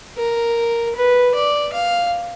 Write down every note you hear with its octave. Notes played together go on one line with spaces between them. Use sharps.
A#4
B4
D5
F5